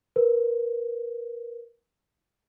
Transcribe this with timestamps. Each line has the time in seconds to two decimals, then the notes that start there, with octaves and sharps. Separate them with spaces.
0.16 A#4 B4